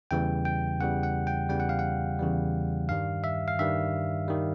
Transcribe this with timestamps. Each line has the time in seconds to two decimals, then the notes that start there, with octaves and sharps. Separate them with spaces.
0.11 E2 C#3 E3 G3 G5
0.45 G5
0.80 E2 C#3 E3 G3 F#5
1.03 F#5
1.27 G5
1.49 E2 C#3 E3 G3 G5
1.60 F#5
1.69 F5
1.79 F#5
2.19 E2 C#3 E3 G3
2.89 G2 D#3 G3 F5
3.24 E5
3.48 F5
3.59 G2 D#3 G3 E5
4.28 D#3 G3